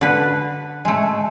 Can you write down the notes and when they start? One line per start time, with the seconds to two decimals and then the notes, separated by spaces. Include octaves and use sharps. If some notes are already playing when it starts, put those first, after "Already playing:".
0.01 D3 B4
0.85 G#3 A3